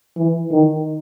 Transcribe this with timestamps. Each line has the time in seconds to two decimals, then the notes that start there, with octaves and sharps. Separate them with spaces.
0.17 E3
0.52 D#3